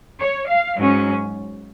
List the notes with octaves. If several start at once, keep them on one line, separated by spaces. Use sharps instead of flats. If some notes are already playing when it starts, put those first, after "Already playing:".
C#5
F5
G#2 F#3 C#4